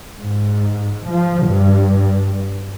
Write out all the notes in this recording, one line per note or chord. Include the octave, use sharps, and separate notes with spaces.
G#2
F3
G2